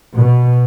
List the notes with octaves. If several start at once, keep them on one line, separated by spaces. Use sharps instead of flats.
B2